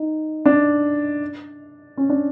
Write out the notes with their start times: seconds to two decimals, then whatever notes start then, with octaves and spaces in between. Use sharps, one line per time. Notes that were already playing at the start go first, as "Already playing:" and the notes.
Already playing: D#4
0.46 D4
1.97 C#4
2.09 D4